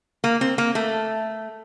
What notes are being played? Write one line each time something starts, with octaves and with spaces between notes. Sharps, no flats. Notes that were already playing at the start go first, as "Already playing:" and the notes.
A#3
C4
A#3
A3